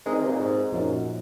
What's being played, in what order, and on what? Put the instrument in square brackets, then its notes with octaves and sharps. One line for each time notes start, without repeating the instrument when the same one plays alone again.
[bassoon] G#3 [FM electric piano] C4 D#4 A#4 D#5
[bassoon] D#3
C3
A#2
G#2
[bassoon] F#2 [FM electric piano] A#2 F3 A#3 D#4